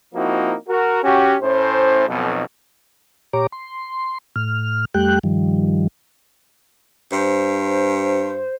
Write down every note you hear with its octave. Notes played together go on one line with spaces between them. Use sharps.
F3 A#3 C4 D#4 E4 F#4
F#4 A#4
C#4 F#4 G4
A2 C#4 C5
B1 F2 B2
A#2 G4 C#5 A#5 D6
C6
A2 F6
F2 G3 A3 G4 G5 F#6
G2 D#3 F3 G3
G2 C5